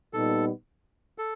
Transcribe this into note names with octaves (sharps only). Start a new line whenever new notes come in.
A#2 G3 B3 D#4 A4
A4